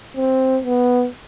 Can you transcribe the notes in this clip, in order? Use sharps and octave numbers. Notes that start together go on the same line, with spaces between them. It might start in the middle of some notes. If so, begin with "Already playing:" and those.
C4
B3